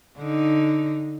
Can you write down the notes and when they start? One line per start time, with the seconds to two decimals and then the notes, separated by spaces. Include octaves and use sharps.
0.18 D3 D#4